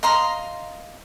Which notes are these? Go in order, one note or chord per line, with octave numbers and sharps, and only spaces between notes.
D#5 F5 A#5 C6